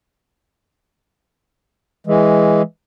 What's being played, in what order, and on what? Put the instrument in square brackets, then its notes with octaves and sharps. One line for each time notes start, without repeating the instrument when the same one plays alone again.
[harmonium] E3 G#3